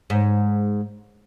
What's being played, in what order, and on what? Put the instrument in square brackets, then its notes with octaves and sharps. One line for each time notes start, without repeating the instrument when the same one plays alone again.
[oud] G#2